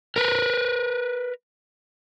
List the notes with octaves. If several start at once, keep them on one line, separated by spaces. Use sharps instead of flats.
A#4 B4